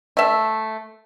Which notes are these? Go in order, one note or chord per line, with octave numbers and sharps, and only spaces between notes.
A3 E5